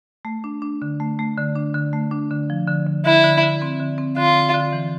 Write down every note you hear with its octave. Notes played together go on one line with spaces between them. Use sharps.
A3
D4
D4
D3
A3
A3
D3
D4
D3
A3
D4
D3
F3
D3
D3
D3 E4
D3
D3
C4
D3
C4
D3 F4
D3
D3
E3